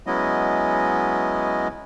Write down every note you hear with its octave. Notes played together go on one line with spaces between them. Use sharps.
F#3 G#3 B3 C#4 E4 D#5